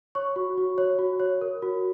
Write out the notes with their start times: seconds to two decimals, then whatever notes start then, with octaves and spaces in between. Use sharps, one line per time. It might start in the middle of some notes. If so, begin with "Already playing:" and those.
0.15 C#5 C#6
0.36 F#4
0.57 F#4
0.78 C#5
0.99 F#4
1.20 C#5
1.41 A#4
1.62 F#4